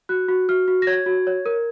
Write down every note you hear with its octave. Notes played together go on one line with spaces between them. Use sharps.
F#4 F#6
F#4
F#4 F6
F#4
A#6
C#5 G#6
F#4
C#5
A#4